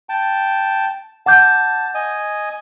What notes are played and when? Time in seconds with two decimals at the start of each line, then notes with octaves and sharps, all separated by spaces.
0.09 G5 A5
1.26 F#5 A5 D6 G6
1.95 D#5 G#5